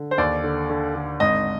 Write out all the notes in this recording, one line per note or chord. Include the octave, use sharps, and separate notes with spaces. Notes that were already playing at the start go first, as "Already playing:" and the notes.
Already playing: D3
C5
D#2 D5
D3
D3
D3
G#1 D#5